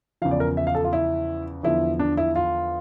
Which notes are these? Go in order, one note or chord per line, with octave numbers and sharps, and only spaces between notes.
E2 C#3 F3 F5
D5
A#4
E5
F5
A4
F4
E4
E2 D3 F3 E4
D4
E4
F4